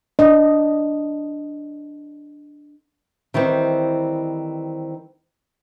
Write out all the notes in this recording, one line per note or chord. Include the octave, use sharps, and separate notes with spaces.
D4 D#5
D#3 E3 G3 C4